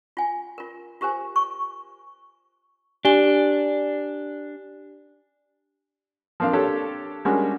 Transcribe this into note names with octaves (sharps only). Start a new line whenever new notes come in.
F4 G#5
F4 A#4
F4 G4 A#4 C5 G#5
C#6
D4 G4 G#5 G7
F3 A#3 C4 D4 F5
A#3 D4 G4 A4 C#5
G3 G#3 A#3 C#4 D4 F#4